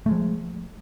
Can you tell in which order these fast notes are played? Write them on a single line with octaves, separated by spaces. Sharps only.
A3 G#3 F3